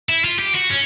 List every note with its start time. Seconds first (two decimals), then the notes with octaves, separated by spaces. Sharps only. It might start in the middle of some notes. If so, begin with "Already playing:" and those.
0.09 E4
0.24 F4
0.39 G4
0.54 F#4
0.70 C#4